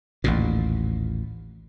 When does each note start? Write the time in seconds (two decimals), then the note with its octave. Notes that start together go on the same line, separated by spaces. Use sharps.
0.24 A1 D#2 A#2